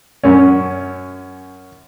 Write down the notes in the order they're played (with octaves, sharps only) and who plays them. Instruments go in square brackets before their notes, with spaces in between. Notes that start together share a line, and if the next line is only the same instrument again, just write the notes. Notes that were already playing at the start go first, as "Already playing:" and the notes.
[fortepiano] F#2 C#4